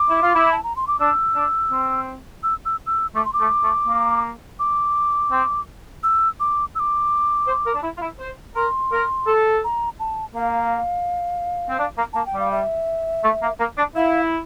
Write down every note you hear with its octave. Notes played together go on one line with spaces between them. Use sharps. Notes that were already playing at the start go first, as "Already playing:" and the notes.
Already playing: D6
E4
F4
E4
A5
A#5
C6
D6
D4 E6
D4
C4
E6
E6
E6
A3 D6
C6
D6
A3
A3
A#3
D6
C4
E6
D6
E6
D6
C5
A#4
D4
E4
F4
E4
C5
A#4 C6
A#4
A4
A#5
A5
A#3 F5
C4
D4
A#3
A#3 A5
G5
G3
F5
E5
A3
A#3
A#3
D4
E4 F5